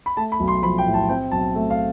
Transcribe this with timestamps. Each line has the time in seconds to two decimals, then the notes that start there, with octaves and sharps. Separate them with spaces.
0.06 B5
0.17 A3 A5
0.32 B5
0.40 B1
0.48 C6
0.63 F3 B5
0.78 G5
0.86 A2
0.94 A5
1.09 C4 G5
1.31 B1 A5
1.55 A3
1.70 F5